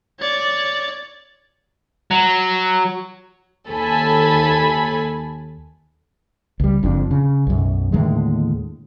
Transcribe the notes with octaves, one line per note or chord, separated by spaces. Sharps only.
C#5 D5
F#3
D#2 A4 G#5 B5
C#2 G3
F#1 F2 F3 D4
C#3
B1 F#2
D#2 A2 D3 G#3